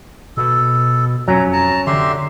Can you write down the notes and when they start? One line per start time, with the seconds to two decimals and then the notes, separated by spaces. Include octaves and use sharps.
0.37 B2 A4
1.28 F2 F#3 C#4 A#5
1.53 A5 A#5
1.87 D3 G4 E5 C6